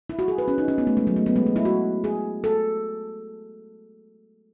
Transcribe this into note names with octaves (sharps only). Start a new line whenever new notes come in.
E4
F#4
G#4
B4
C#4
D#4
C#4
B3
A3
G#3
F#3
A3
B3
G#3
A3
E4
F#4
G#4
A4